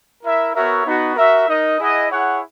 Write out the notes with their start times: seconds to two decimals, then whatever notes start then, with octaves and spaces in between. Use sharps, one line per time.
0.22 E4 A#4 E5
0.54 B3 F#4 A#4 C#5 E5
0.85 B3 D#4 F#4
1.16 F#4 A#4 E5
1.47 D#4 A#4 D#5
1.78 E4 G#4 D#5 F#5
2.10 E4 G#4 C#5 F#5